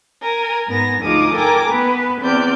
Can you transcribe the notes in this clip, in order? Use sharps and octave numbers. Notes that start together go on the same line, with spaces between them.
A#4 G#5
G#2 B3 G#5 A#6
D2 F3 D#4 G#4 D6 D#6
A4 A#4 G5 G#5 A#5 D6
B3 B4
E2 C4 D5 G6